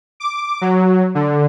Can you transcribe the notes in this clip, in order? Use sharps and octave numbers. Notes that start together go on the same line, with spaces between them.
D6
F#3
D3